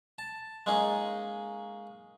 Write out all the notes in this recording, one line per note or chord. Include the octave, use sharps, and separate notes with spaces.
A5
G#3 A#3 C#4 D#4 G#4